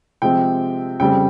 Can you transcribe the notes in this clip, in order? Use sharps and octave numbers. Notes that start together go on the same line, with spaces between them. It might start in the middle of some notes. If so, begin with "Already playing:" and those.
C3 F3 G#3 C4 G5
F2 C#3 G3 C4 G5